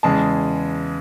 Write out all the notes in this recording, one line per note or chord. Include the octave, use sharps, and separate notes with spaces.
E2 C#3 G#3 A5